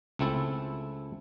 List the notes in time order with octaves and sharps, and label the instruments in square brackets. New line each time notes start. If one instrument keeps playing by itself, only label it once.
[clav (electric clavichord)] C#2 A3 C4 E4 A5